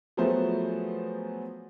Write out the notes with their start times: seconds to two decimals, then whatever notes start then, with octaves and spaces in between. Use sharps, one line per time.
0.17 F3 F#3 A3 B3 G#4 C5